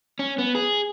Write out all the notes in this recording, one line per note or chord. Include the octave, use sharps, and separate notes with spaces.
C#4
B3
G#4